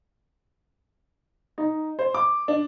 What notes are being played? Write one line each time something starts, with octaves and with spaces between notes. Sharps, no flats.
D#4
C5
D6
D4